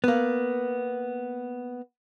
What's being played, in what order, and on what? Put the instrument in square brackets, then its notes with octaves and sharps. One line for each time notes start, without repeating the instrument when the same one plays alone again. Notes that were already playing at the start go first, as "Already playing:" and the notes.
[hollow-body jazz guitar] A#3 B3